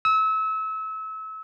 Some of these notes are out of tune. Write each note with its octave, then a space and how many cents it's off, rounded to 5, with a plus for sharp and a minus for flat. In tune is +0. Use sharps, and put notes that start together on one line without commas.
E6 -30